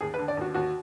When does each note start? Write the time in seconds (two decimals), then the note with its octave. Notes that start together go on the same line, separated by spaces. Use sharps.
0.01 D#2 G#4
0.14 B4
0.18 D3
0.28 D5
0.37 D#2 F#4
0.54 D#2 F#4